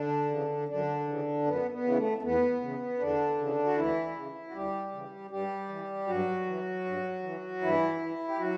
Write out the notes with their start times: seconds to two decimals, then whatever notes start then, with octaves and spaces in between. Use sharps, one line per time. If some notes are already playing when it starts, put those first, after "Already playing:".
Already playing: D3 D4
0.30 C#3 E3
0.68 F#2 D3 D4
1.07 C#3 E3
1.45 F#2 B3
1.71 B3
1.84 C#3 E3
1.97 A3
2.18 A3
2.22 E2 B3
2.61 C#3 E3
2.99 E2 D3 D4
3.38 C#3 E3
3.65 F#4
3.76 D2 E3 E4
4.15 C#3 E3
4.48 F#4
4.54 D2 G3 G4
4.92 C#3 E3
5.30 G2 G3 G4
5.69 E3
6.07 G2 F#3 F#4
6.46 E3
6.85 G2
7.23 E3
7.61 G2 E3 E4
8.00 E3
8.28 G4
8.39 F#3 F#4